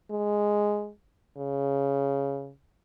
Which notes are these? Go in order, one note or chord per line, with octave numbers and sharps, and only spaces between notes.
G#3
C#3